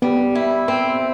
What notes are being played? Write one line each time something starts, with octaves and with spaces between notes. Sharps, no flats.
G3 B3
E4
C4